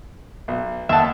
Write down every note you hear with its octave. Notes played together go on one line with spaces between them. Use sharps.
B1
D#2 E5 F#5 A5